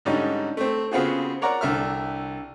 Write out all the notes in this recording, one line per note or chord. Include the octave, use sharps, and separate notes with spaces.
G#2 D3 G3 C#4 D#4
A3 C4
C#3 B3 C4 F4 F#4 G#4
A#4 C#5 D5 F#5 A#5
C2 D3 E5 F6